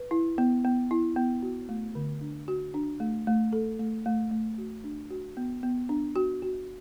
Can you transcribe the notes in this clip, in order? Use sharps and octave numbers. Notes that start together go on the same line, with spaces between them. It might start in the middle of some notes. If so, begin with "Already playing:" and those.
Already playing: B4
E4
B3
B3
E4
B3
F#4
A3
D3
D4
F#4
D4
A3
A3
A4
A3
A3
A3
F#4
D4
F#4
B3
B3
D4
F#4
F#4